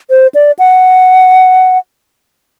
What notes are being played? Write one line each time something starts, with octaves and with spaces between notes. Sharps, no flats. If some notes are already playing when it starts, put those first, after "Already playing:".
C5
D5
F#5